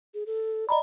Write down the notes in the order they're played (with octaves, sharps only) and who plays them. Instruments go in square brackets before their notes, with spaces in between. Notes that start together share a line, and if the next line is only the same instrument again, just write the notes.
[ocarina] G#4
A4
[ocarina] D5 [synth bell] D#5 A#5 B5